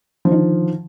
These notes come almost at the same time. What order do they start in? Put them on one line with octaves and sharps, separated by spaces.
F3 D3 D#3